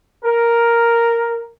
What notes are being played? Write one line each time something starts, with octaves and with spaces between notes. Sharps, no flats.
A#4